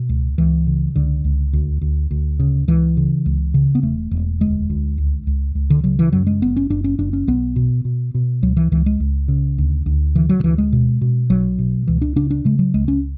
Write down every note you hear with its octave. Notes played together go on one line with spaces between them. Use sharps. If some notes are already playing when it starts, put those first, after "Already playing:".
Already playing: B2
C#2
C#2 E3
C#3
C#2 D3
C#2
D2
D2
D2
C#3
C#2 E3
C#3
C#2
C#3
B3
E1 A3
E1
D2 G#3
D2
C#2
C#2
C#2
D3
C#3 F#3
E3
F#2 F#3
G#3
F#1 B3
C#4
F#1 D4
C#4
F#1 D4
C#4
B1 B3
B2
B2
B2
C#2 F#3
E3
C#2 E3
G#3
C#2
C#3
D2
D2
D3 E3
F#3
D3
D2 E3
G#3
B2
B2
B1 F#3
B2
C#2 E3
D4
C#3 D4
D4
C#3 G#3
F#3
C#2 G#3
C#4